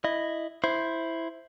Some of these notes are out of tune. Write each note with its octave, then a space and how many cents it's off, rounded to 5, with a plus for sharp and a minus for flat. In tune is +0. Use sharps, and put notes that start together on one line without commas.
E4 +0 D#5 -10
E4 +0 C5 +0